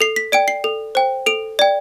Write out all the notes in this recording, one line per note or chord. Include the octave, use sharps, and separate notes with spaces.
A4 C7
B6
D5 G5 D7
C7
A4
C5 G5
A4 D7
D5 G5